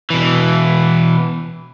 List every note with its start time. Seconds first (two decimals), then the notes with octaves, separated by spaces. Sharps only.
0.10 B2 E3